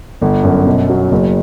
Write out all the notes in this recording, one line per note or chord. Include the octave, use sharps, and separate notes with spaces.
G1
F#2
B2
F#3
F#1